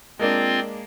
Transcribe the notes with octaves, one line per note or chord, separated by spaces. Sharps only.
G#3 A#3 C4 D4 F4